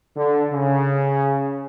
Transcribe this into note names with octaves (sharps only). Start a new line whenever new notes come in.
D3
C#3